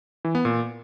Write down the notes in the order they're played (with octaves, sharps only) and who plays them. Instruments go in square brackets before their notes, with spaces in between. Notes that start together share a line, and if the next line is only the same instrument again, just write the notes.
[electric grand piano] E3
B3
A#2